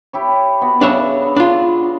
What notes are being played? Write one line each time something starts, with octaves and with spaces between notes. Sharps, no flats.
E4 G4 C#5
B3 F#4
C#3 D4 C#5 E5
D4 F4